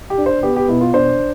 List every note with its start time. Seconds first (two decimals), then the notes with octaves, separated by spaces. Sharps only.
0.10 G4
0.18 D4
0.26 C5
0.43 B3 G4
0.56 G4
0.68 B2 E4
0.81 F4
0.93 D4 C5